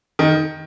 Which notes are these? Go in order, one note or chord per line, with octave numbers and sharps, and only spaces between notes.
D#3